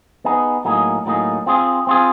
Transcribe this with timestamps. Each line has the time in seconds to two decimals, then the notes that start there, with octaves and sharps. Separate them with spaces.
0.25 B3 D#4 G#4
0.65 A2 F#3 A#3 D#4 G#4
1.05 A2 F#3 A#3 D#4 G#4
1.46 C4 F4 G#4
1.87 C4 F4 G#4